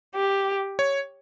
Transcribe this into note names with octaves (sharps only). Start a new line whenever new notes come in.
G4
C#5